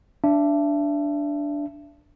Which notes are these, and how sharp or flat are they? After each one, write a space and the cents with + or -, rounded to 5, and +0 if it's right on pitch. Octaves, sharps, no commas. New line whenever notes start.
D4 -5 E5 +30